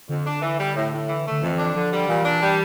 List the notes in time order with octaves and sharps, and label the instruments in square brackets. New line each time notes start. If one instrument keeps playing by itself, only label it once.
[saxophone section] F2 [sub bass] D3
[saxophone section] D4
E3
G3
A2
A2
E3
A3
[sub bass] D3
[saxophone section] F2 [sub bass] E3
[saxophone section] D4
[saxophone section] D3 [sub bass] F3
[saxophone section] G3
[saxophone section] A#2 [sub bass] E3
[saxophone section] D4
G3